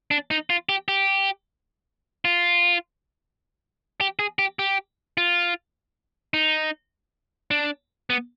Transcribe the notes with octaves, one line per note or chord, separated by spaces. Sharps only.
D4
D#4
F4
G4
G4
F4
G4
G#4
G4
G4
F4
D#4
D4
B3